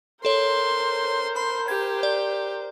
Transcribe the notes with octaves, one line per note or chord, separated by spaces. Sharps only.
A4 A#4 C5 C#5 C6
B5 C6
G4 G#6
D5